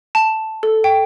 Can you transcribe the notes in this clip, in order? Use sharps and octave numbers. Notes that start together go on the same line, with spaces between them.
A5
A4
G5